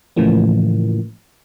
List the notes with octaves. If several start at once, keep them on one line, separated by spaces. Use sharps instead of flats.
A2 C#3 E3 F3 A#3